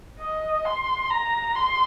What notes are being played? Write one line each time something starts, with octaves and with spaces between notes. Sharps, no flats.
D#5
C6
A#5
C6